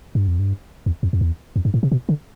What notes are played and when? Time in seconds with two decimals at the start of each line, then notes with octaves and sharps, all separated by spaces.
0.15 G2
0.28 F2
0.39 G2
0.86 E2
1.03 F2
1.13 F2
1.21 E2
1.56 F2
1.65 G2
1.74 A2
1.83 C3
1.92 B2
2.09 D3